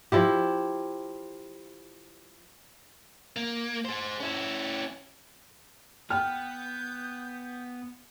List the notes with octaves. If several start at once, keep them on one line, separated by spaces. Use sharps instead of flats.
F3 E4 G4
A#3
G#4 C5
C#4 E4
B3 G5 F6 G6